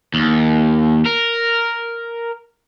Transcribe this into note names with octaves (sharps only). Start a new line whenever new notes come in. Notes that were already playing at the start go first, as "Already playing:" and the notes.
D#2
A#4